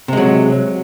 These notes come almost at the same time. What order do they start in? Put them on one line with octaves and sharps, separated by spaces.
C3 G#3 F#3